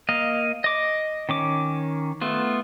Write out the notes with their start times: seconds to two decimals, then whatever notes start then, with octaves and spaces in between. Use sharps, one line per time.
0.09 A#3 D#5 F5
0.64 D#5 D6
1.29 D#3 C#4 D6
2.21 A3 B3 F4